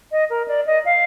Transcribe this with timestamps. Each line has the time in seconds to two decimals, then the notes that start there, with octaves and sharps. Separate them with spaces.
0.12 D#5
0.30 A#4
0.48 D5
0.66 D#5
0.85 F5